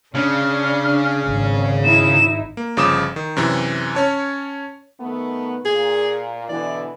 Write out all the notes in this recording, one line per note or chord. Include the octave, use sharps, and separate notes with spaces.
C#3 C#4 D4 F6
G#1
D#4 E4 E7
A#3
G1 C#3 F3 D6 D#6 E7
D#3
F#2 C3 E3
C#4 C#5 A5
D#3 A3 B3
A#2 G#4
B2 D3 E3 D5